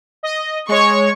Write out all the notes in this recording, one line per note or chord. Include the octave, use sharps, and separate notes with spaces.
D#5
G#3 C#5 C#6